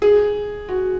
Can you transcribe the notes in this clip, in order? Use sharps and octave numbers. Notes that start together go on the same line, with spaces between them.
G#4
F#4